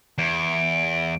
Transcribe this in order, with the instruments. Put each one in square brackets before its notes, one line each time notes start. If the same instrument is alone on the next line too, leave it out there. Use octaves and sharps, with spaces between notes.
[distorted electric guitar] E2 [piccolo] D7